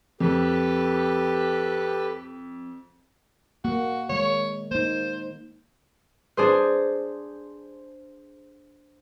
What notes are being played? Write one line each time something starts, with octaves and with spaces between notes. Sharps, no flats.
F2 G4 A4 B4
A#3 F#4
D#3 G#3 C#5
A#3 D#4 C5
D4 G#4 C5